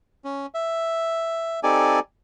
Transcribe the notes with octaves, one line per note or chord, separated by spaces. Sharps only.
C#4
E5
C4 D#4 G4 A4 D5 G#5